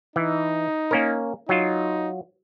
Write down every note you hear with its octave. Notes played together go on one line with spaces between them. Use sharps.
E3 D#4
A#3 C#4 A#4
F#3 D#4 F4